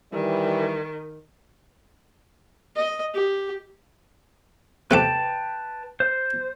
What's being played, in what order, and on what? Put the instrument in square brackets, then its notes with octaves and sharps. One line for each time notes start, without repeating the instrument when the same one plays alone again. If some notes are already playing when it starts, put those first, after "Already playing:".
[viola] D#3 [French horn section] E3 G3
[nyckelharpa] D#5
G4
[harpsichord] C3 A3 G4 [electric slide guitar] B4 G5 A5
[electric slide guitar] C5